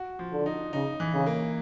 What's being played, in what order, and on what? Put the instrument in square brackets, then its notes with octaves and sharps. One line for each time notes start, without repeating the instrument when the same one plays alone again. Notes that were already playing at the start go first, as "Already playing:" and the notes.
Already playing: [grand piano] F#4
F3
[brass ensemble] D3
[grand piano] D#4
[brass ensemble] C#3 [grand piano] D#4
[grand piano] E3
[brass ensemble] C#3
[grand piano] A#3